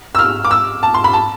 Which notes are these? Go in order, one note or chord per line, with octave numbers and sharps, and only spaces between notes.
E6
F6
D6
E6
A5
C6
B5
A5